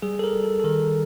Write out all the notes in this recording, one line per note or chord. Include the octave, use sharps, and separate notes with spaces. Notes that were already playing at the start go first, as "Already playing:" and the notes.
G3 G#4
A4
A#4
G3
A4
A4
D#3 A#4